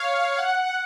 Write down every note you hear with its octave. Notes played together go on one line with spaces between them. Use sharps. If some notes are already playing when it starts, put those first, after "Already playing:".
Already playing: C#5 F5
F#5